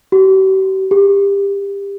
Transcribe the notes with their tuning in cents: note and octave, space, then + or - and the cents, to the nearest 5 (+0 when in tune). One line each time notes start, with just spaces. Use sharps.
G4 -45
G4 +25